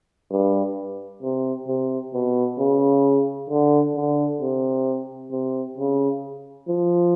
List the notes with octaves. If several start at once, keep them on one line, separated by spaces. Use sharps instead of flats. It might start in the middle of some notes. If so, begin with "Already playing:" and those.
G2
C3
C3
B2
C#3
D3
D3
C3
C3
C#3
F3